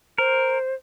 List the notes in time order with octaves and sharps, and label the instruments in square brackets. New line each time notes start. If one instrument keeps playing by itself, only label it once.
[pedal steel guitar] A#4 [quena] C5